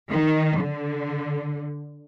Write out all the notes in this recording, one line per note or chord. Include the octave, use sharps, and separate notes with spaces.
D#3
D3